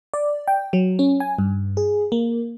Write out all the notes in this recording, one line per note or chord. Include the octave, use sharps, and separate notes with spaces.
D5
G5
F#3
C#4
G#5
G2
G#4
A#3